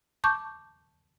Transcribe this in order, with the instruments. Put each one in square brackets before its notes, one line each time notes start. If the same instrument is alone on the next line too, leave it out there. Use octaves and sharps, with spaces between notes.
[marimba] A5 C#6 D6 G6